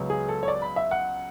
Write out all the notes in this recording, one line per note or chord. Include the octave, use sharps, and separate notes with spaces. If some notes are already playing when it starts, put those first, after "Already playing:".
Already playing: C#2 C#3 F#3 B3
G#4
A4
C#5
D5
B5
E5
F#5